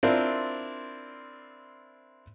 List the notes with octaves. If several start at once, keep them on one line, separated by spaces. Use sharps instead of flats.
C4 D4 E4 F4 A#4 D5